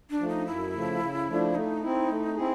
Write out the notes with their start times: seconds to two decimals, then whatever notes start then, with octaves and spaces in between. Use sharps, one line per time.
0.10 D4
0.19 F3 A3
0.28 D#4
0.47 F#2 E4
0.74 C#3 F3 A3
1.00 C#3
1.28 F3 A3 D4
1.55 A3 D#4
1.82 C4 E4
2.09 A3
2.36 C4 E4 G#4